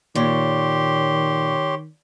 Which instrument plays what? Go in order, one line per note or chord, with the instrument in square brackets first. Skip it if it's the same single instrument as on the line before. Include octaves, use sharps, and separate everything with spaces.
[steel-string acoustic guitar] A#2 [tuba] D#3 [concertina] G4 C6 [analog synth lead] C#5